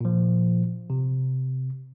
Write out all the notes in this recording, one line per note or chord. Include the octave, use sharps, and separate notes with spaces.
A#2 F3
C3